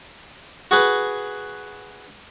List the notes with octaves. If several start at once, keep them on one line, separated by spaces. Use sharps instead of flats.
F#4 G#4 B4